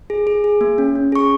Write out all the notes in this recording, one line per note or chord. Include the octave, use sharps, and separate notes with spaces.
G#4
G#4
G#4
A#3
C#4
C#4
G#4 C#6